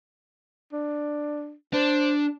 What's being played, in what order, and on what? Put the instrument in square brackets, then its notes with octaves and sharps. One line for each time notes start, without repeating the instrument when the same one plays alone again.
[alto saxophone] D4
[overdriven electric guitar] D4 [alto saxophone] C5